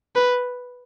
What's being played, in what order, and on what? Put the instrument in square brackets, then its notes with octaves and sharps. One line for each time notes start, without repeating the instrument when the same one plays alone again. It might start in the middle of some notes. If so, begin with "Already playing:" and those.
[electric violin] B4